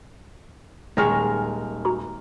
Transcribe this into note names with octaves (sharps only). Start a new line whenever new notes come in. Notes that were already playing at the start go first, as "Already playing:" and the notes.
D#1 D#3 G#3 C#5 F6
F#4 A#5